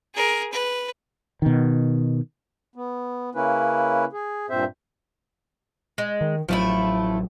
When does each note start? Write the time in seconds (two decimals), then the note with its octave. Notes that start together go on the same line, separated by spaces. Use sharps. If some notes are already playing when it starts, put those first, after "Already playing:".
0.15 G#4 A#4
0.52 B4
1.42 B2 D#3
2.75 B3
3.35 C#3 A#3 C#4 E4 B4
4.13 G#4
4.50 G2 A#2 C4 C5 E5
5.98 G#3
6.21 D#3
6.49 A1 F3 F#3 A3 E4